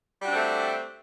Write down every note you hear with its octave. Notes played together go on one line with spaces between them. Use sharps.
G3 A3 C4 D4 F#4